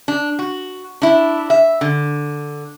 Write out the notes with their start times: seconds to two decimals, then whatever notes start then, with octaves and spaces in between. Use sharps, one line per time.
0.08 D4
0.39 F#4
1.02 D4 E4
1.50 E5
1.81 D3